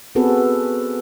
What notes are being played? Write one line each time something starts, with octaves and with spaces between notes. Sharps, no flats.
B3 C4 F#4 G#4 A4 B4